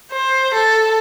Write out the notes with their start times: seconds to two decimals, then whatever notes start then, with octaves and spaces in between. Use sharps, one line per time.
0.11 C5
0.54 A4